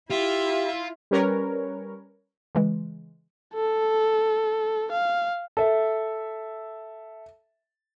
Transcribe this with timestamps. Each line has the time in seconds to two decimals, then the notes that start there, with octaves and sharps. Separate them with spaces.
0.10 E4 F4 G4 E5
1.11 G3 C#4 A#4 B4 C#5
2.55 C#3 E3 G#3
3.54 A4
4.92 F5
5.57 A4 E5